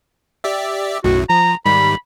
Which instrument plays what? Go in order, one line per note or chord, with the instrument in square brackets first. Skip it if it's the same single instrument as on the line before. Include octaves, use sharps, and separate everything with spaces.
[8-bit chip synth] G4 D5 E5
[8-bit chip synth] B1 F#2 A2 [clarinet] F#4
[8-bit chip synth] F3 [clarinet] A#5
[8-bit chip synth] G#2 D#3 G3 [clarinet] B5